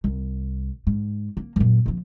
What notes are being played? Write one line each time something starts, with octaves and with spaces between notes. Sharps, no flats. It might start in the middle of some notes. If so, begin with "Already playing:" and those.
C2
G#2
A#3
F#2 A#2
F3 A#3